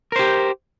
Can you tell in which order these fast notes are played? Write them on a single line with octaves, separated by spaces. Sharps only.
A#4 C5 G4